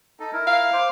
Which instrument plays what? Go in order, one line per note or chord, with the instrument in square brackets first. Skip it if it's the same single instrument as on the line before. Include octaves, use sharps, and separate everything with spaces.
[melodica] D#4 A4
E4 A#4
[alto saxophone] F5
[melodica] C5 D6